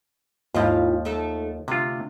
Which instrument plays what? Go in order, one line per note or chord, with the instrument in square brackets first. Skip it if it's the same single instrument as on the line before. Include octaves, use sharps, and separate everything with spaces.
[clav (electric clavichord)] D#2 F3 [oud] G#2 E4 F4
[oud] A3 D#4 A4
[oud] D2 [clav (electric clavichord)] C3 F4